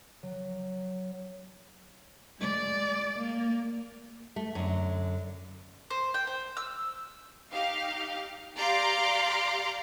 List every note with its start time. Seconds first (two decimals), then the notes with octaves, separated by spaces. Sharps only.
0.23 F#3
2.39 G#3 D5
3.18 A#3
4.36 A3
4.55 F#2 D3
5.90 C5
6.14 G5
6.27 C5
6.57 E6
7.52 D#4 G4 F5
8.56 G4 D5 F5 A#5 C6 D6